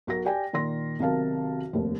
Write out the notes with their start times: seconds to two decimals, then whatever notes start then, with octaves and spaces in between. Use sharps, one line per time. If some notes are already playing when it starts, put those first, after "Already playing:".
0.07 B1 F#4 A#4 A#6
0.25 G4 D5 G5 G#5
0.53 A#2 D#3 C6 A#6
0.99 B1 C3 D#3 A#4 F5 A5
1.73 F1 D#2